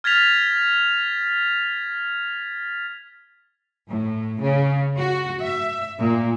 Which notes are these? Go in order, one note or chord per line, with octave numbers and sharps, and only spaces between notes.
F6 G#6 A6 B6 F7
A2
C#3
F#4
E5
A#2